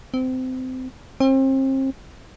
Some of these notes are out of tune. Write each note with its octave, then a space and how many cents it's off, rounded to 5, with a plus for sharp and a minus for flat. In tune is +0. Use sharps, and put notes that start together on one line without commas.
C4 -25
C4 +35